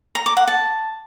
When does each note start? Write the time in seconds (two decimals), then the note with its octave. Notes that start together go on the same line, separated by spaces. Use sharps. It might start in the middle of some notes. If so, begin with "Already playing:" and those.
0.15 A#5
0.26 D6
0.37 F#5
0.47 A5